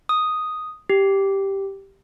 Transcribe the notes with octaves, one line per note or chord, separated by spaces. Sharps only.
D#6
G4